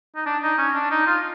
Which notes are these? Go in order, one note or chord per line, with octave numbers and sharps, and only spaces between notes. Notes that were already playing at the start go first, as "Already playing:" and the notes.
D#4
D4
D#4
C#4
D4
D#4
F4